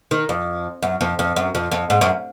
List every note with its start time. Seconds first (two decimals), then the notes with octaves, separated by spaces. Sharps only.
0.11 D#3
0.29 F2
0.82 F#2
1.01 F2
1.19 F2
1.36 F#2
1.55 F2
1.71 F2
1.90 G#2
2.01 F#2